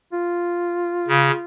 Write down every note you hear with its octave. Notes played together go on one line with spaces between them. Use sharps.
F4
C#3